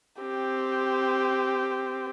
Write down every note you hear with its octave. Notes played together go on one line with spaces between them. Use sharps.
C4 G4